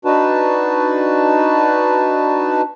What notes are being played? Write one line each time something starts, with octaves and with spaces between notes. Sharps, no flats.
D4 D#4 F#4 B4 A5